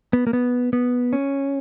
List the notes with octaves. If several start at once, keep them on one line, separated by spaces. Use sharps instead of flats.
B3
A#3
B3
B3
C#4